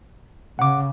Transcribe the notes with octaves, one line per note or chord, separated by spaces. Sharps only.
C#3 F#5 D6